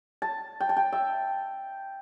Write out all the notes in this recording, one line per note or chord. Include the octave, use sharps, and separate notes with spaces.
A5
G5
A5
G5
E5